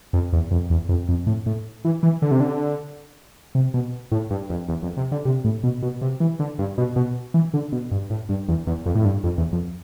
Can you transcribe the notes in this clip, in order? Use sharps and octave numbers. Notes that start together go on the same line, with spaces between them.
F2
E2
F2
E2
F2
F2
A2
A2
E3
E3
D3
C3
D3
C3
B2
A2
G2
F2
E2
F2
C3
D3
C3
A2
B2
B2
C3
E3
D3
G2
B2
B2
E3
D3
B2
G2
A2
G2
E2
E2
F2
A2
G2
F2
E2
F2